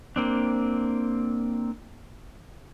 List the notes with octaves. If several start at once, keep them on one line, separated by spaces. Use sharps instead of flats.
A#3 C4 D4